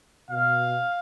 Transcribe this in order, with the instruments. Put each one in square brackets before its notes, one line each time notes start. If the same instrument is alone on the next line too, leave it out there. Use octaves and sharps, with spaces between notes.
[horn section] B2 F5